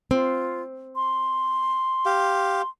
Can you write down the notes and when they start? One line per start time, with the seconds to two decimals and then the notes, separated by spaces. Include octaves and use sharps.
0.11 C4 F4
0.96 C6
2.06 G4 F5